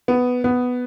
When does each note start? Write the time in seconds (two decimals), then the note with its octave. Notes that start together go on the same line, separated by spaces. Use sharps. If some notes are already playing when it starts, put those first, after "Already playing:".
0.08 B3
0.44 B3